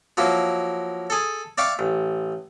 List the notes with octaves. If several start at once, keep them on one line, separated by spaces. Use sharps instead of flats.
F3 F#3 A#3 E4
G#4 A4
D5 E5 F5 G5 C#6
A1